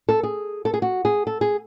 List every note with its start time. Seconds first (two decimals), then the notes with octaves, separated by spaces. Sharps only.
0.09 A4
0.23 G#4
0.65 A4
0.74 G#4
0.82 F#4
1.05 G#4
1.27 A4
1.41 G#4